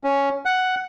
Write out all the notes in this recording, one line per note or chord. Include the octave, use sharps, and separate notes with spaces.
C#4
F#5